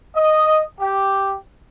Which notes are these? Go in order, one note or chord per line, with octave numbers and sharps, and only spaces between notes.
D#5
G4